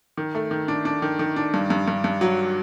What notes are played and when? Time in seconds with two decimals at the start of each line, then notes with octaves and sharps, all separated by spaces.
0.17 D#3
0.35 A3
0.51 D#3
0.68 D4
0.85 D4
1.02 D#3
1.19 D#3
1.36 D4
1.54 G2
1.70 G2
1.88 G2
2.04 G2
2.21 F#3